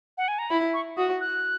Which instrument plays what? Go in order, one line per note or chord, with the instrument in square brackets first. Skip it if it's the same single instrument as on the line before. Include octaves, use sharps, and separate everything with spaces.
[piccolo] F#5
G#5
A#5
[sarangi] E4 [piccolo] B5
[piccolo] C#6
[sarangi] F#4 [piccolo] D#6
[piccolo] F#6